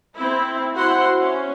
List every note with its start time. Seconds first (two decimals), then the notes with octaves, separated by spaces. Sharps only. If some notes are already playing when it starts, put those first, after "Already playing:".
0.15 C4 E4
0.74 E4 F#4 C5 F#5 C6
1.20 C#4